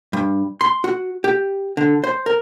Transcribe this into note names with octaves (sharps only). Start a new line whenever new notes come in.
G2
C6
F#4
G4
D3
C5
A#4